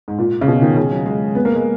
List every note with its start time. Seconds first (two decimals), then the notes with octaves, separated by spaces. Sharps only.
0.08 G#2
0.19 A#2
0.41 C#3
0.48 B2
0.62 D#3
0.77 C#3
0.91 F#3
1.06 G#3
1.35 B3
1.45 A#3
1.55 G#3